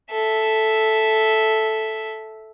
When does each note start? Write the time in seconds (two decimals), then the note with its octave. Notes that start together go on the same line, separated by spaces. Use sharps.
0.11 A4 E5